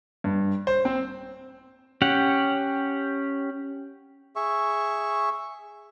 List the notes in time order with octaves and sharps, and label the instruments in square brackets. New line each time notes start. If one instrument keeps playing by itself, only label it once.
[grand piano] G2
C5
C4
[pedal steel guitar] C#4 G4 F#5
[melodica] G#4 E5 C#6